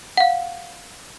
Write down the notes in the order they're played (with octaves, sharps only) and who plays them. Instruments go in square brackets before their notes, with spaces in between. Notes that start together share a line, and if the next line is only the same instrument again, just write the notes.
[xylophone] F5 F#5